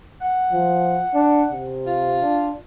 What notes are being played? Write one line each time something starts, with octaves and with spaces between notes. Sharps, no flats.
F#5
F3
D4
C3
F4
D4